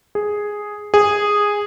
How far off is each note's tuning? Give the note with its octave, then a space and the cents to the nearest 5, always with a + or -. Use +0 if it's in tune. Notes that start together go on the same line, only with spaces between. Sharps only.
G#4 +0
G#4 -10